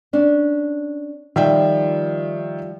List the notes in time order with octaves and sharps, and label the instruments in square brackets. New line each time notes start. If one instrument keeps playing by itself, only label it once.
[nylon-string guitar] C#4 D4
[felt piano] D#3 E5 G5 [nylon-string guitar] F3 G3 F4